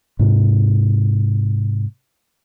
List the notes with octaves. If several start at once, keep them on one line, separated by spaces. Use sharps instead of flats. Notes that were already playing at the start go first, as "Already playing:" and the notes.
G#2 C3